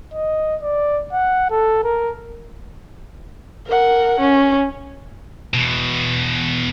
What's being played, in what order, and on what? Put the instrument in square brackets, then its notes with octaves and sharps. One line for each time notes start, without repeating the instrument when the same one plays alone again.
[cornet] D#5
D5
F#5
A4
A#4
[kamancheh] A#4 F#5
C#4
[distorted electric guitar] E2 B2